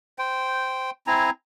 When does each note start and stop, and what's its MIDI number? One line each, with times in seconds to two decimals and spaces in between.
0.19 0.91 72
0.19 0.91 79
1.07 1.30 60
1.07 1.30 64
1.07 1.30 80
1.07 1.30 82